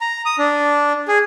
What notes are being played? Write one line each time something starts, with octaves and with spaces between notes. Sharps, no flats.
A#5
D#6
D4
G#4